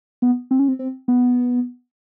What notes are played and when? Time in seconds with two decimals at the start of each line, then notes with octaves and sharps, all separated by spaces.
0.22 B3
0.51 C4
0.59 C#4
0.68 C4
0.79 C4
1.08 B3